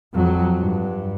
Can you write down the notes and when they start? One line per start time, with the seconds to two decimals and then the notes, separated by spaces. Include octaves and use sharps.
0.14 F2 F#3
0.59 G2